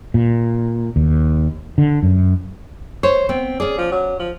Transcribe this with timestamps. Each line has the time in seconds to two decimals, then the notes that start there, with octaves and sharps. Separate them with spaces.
0.14 A#2
0.96 D#2
1.78 D3
2.03 F#2
3.03 C5 C#5
3.29 B3 C4
3.60 C#4 G#4 D5
3.78 F3
3.91 F#3
4.19 F3